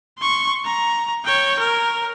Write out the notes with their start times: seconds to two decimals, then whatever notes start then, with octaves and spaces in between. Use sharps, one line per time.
0.19 C6 C#6
0.65 A#5
1.25 C#5 G5
1.59 A#4